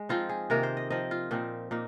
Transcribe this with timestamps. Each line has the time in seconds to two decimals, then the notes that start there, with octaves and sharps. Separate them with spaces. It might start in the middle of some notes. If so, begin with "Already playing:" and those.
Already playing: G#3
0.09 F3 C4 D#4 F4
0.29 G#4
0.50 C3 D#3 A#3 F4 A#4
0.63 C5
0.77 D#5
0.90 F3 C4 D#4 D#5
1.11 F4
1.31 A#2 F3 C4 D#4
1.71 A#2 A#3 D#4